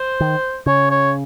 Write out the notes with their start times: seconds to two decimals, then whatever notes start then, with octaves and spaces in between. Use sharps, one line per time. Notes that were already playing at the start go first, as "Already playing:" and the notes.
Already playing: C5
0.20 D#3
0.66 C#3 C#5
0.91 C#5